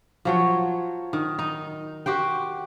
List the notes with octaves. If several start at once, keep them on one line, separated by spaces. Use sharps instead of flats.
F3 F#3 C#5
D#3
D#4
F#4 G4 C5 G5